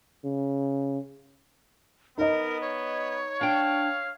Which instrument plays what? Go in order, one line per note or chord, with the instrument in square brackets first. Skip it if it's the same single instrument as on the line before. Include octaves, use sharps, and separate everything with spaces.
[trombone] C#3
[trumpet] B3 [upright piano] D#4 D#5 [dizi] A#4
[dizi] C#5
[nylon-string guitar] D4 G5 [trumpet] F5